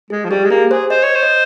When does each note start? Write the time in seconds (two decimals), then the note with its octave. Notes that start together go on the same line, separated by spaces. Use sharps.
0.10 G#3 G#4
0.25 F3
0.30 G3 G4
0.45 G#3
0.50 A#3 G#4
0.71 G#4 C5
0.90 C5 D#5
1.03 C#5
1.15 C5
1.23 D#5